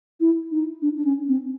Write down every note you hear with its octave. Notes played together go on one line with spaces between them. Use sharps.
E4
D#4
D4
D4
C#4
C4